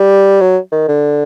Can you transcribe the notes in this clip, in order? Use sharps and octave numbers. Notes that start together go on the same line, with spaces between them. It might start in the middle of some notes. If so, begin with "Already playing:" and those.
Already playing: G3
F#3
D#3
D3